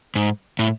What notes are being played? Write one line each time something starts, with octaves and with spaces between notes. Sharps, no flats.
G#2
A2